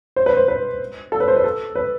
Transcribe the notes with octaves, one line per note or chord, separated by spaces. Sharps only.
C5
B4
C5
B4
A4
B4
C5
B4
A4
B4